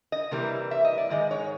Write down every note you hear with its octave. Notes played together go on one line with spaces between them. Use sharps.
D#5
C3 E3 G3 A#3
E5
D#5
D5
G#2 D#3 G#3 D#5
C#5